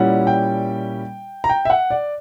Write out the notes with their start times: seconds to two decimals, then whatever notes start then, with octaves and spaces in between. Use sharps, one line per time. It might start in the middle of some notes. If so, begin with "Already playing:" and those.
Already playing: A#2 G3 C#4 E4 F#5
0.27 G5
1.44 A#5
1.49 G5
1.65 E5
1.70 F#5
1.91 D5